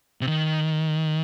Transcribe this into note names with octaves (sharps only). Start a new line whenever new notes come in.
C3
D#3